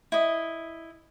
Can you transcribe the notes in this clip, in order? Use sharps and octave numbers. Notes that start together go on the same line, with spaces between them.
E4 D#5